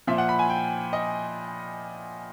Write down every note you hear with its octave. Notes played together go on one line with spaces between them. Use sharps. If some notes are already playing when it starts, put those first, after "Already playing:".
A#2 F3 E5
F#5
B5
G#5
G5
D#5